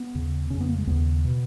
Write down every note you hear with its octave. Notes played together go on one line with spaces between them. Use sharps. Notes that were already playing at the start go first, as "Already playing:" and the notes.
Already playing: B3
D#2 C#3
F2 C#3 C#4
B3
A#3
G#3
D#2 C#3 B3
B2